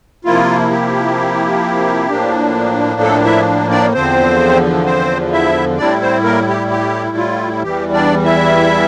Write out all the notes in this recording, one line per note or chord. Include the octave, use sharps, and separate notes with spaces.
C3 F3 A#3 E4 F4
G4
A2 F3 A#3 D4
A3 A4
E4 E5
D4 D5
E2 D3 F3 C4 C5
C4 C5
E4 E5
A2 G3 C4 D4 E4 D5
C4 C5
A#3 A#4
G4
G4
F4
E2 E3 G3 G4
D4 D5
E4 E5